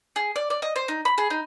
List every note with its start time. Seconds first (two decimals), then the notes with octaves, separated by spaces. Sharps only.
0.16 G#4
0.36 D5
0.50 D5
0.62 D#5
0.76 C5
0.88 D#4
1.05 B5
1.18 G#4
1.30 D#4